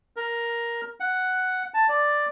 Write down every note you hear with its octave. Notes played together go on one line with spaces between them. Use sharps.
A#4
F#5
A5
D5